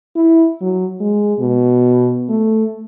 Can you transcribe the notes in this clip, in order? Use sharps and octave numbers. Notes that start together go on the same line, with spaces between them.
E4
F#3
G#3
B2
A3